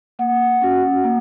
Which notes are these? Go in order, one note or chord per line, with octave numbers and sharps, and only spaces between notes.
A#3 F#5
C#4 F#4
A#3